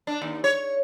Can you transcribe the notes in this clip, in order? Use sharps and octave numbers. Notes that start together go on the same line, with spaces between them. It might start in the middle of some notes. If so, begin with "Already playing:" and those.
D4
D#2
C#5